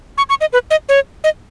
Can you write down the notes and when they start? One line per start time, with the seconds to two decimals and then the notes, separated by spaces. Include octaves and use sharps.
0.18 C#6
0.29 C#6
0.41 D#5
0.53 B4
0.71 D#5
0.89 C#5
1.24 D#5